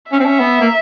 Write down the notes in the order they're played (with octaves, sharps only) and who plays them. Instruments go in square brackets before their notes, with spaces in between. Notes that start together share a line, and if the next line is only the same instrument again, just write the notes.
[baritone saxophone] C#4 [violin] E5
[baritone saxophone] C4
C#4
B3
A#3